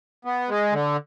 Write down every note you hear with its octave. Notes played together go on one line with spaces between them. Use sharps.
B3
G#3
D3